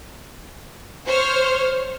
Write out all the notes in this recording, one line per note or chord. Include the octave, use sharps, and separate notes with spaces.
C5 C#5 F6